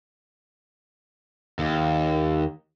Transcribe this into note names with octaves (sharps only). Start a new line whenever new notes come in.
D#2